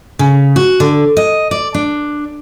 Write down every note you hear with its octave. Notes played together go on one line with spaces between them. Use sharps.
C#3
F#4
D3
D#5
D5
D4